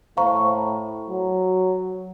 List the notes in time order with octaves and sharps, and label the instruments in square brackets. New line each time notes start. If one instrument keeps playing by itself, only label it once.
[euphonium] A2 [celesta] C5 F5 A#5 C#6
[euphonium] F#3